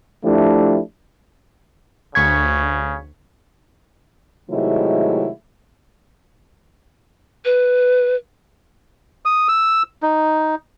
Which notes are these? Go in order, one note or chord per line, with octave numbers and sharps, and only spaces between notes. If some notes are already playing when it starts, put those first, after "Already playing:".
F3 A3 D4 E4 G4
D2 C#3 C#6 G#6 B6
C3 D#3 F#3 G#3 A3 E4
B4
D#6
E6
D#4